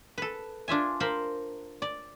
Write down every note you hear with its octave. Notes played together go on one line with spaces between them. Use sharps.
A4 B4
D4 F4 E5 G#5
A#4 C5 F5 B5
D5